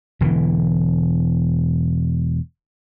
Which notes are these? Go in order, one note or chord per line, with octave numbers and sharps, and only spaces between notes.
E1 D3 E3